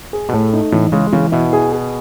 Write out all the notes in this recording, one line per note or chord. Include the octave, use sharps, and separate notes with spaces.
G#4
B2
A2 A3
D#4
A2 E3
C#3 G#3
C#3 E3
B2 E4
G#4
G#4